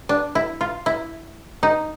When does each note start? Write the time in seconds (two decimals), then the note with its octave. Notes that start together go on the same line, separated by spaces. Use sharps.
0.09 D4
0.35 E4
0.61 F4
0.86 E4
1.63 D#4